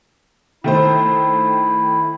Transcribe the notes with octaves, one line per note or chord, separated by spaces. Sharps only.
D#3 A3 E4 C5